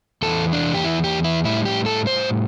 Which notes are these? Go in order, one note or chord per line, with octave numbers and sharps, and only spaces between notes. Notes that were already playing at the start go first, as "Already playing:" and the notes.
E2 E3 A4
D4
G4
E4
G4
E4
A2 G3 E4
G4
A4
C5